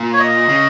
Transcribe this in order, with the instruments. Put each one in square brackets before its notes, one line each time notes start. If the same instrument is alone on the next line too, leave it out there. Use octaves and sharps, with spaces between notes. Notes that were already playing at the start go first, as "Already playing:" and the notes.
Already playing: [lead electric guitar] A#2
[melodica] C#5
D#5
[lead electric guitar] C#3